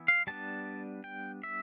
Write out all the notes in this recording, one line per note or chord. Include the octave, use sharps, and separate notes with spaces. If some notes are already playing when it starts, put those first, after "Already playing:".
Already playing: E3 B3 E4
F5
G3 B3 D4 A5
G5
E5